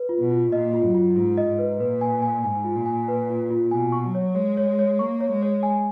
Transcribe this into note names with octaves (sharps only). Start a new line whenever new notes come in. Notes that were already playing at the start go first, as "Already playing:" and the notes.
Already playing: B4
F4
B2
F4
A#2 D#5
F4
F#2
F4
G#2 F4
D#5
G#2
B4
A#2 B4
G#5
G#5
G#2 G#5
F4
A#2
G#5
B4
F4
F4
B2 G#5
C#6
F#3
C#5
G#3 C#5
C#5
C#5
A#3 C#6
C#5
G#3
C#5
G#5